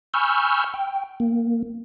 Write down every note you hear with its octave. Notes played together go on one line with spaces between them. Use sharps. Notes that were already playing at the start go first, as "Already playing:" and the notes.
G#5 B5 C#6 E6 F6 G6
G5
A#3